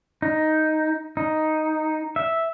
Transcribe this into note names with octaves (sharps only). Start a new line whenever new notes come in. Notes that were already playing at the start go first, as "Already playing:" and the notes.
D#4
D#4
E5